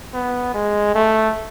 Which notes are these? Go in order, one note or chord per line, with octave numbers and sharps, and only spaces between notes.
B3
G#3
A3